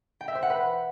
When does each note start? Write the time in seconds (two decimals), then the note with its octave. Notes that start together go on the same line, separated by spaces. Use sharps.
0.21 G5
0.28 E5
0.35 C5
0.42 F#5
0.50 B4